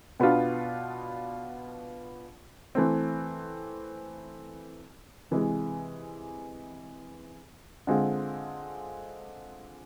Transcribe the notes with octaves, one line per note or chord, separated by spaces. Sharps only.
B2 B3 D4 F4
E3 A3 C4
C3 E3 G#3
D3 G#3 C4 F4